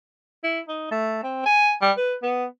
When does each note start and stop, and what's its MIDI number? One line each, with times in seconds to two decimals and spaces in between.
0.44 0.61 64
0.68 0.88 63
0.91 1.19 57
1.23 1.43 60
1.46 1.74 80
1.82 1.92 55
1.97 2.14 71
2.23 2.46 59